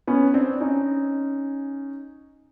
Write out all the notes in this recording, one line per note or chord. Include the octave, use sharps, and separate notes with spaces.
B3 C#4
C4 D4
C#4 D#4